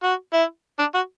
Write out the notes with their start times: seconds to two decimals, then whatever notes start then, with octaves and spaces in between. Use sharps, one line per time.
0.03 F#4
0.33 E4
0.79 D4
0.95 F#4